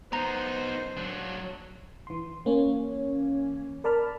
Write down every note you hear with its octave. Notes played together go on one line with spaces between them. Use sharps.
B3 D#4 C5 A#5
F#3 D4
E3 C6
E3 A#3 C#4 C#5
A#4 D5 A5 B5 F6